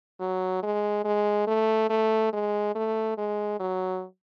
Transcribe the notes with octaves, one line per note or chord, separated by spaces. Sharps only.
F#3
G#3
G#3
A3
A3
G#3
A3
G#3
F#3